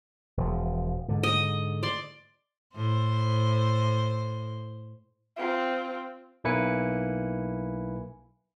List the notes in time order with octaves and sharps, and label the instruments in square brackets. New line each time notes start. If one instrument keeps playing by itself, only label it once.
[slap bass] E1 F3
G#2 D3
[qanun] D#5
D5 C6
[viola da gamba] A2 C5
[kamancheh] C4 F4
[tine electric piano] B1 A#3 E4 B4 G#5 C#7